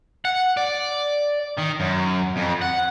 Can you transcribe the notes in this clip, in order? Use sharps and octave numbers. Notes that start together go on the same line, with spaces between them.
F#5
D5
D#3
F#2
F2
F#5